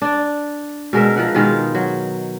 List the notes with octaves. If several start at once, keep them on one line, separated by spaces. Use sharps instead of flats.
D4 D5
B2 G#3 A#4 E5
F3 A#4 F#5
B2 D#3 G#3 F4
F#3